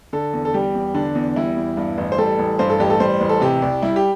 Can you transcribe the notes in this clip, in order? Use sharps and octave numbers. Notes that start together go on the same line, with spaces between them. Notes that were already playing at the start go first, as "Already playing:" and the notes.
D3 A4
E2
A4
G3 G4
E2
D3 D4
E2
G3 E4
E2
G2
A1
C5
G3 A4
A1
G2 C5
A4
A1 G4
A4
G3 C5
A1
A4
C3 G4
C2
G3 E4
G4